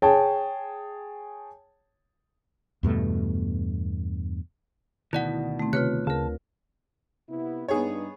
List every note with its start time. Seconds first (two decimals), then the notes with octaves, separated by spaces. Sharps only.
0.02 G#4 C#5 G5 A5
2.83 E2 G2 B2 A3
5.13 D2 B2 D#3 E4 D5 F#5
5.59 A3 C4
5.73 C3 F4 B4 C#5 F#6
6.07 D2 C#3 A#4 A5
7.30 C3 B3 E4
7.68 G2 B3 D#4 G#4 C#5